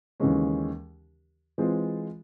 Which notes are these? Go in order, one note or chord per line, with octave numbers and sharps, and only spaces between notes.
D#2 C#3 E3 G#3 C#4
E3 G#3 C4 F4